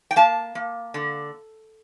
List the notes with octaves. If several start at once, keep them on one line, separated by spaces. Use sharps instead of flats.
G5
A#3 F5 A5
A#3
D3